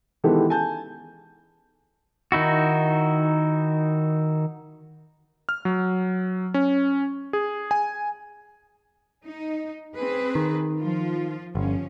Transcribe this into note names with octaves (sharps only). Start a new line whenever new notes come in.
D#3 E3 G#3 B3 G4 A4
G#5 A5 G6
D#3 D#4 E4 F#4
F6
F#3
C#4
G#4
G#5
D#4
C4 G#4 B4
D#3
F3 F4
G1 F3 C#4